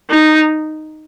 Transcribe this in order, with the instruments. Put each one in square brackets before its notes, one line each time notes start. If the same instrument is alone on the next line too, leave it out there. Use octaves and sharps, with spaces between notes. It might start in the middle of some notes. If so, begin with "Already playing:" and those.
[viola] D#4